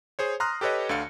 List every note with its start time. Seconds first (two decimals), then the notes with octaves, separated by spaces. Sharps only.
0.19 G#4 C5 C#5
0.40 A#5 C6 D#6 F6 F#6 A#6
0.61 G4 A4 B4 C#5 D#5
0.89 D2 D3 F5 C#7